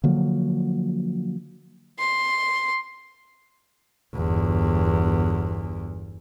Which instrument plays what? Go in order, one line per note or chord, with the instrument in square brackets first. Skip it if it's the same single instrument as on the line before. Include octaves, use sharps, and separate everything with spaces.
[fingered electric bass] D3 F3 F#3 A#3
[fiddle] C6
[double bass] G1 E2